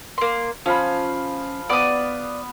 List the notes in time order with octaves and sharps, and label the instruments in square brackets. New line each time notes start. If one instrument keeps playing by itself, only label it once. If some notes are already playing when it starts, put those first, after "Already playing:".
[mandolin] A#3 C6
[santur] F3 F5 B5 [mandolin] C#4
[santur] B3 [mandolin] D5 D#6